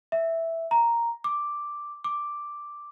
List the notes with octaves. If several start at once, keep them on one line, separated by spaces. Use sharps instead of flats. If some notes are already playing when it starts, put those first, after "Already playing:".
E5
A#5
D6
D6